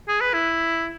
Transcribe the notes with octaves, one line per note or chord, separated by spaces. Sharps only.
G#4
B4
E4